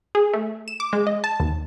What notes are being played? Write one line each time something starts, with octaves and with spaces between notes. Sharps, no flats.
G#4
A3
E7
D6
G#3
D#5
A5
D#2